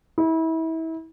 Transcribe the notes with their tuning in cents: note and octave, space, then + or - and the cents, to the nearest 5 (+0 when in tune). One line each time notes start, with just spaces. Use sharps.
E4 -30